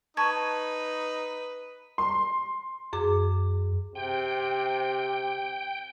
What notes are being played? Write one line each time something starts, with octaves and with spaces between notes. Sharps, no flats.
D#4 B4 A5 C#6 G#6
C6
F#2 G#4 D6
C3 G5